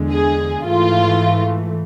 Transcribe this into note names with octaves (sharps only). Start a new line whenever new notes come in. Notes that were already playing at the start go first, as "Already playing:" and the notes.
Already playing: E2 D3 G#3
G#4
G#2 E3 A3 F4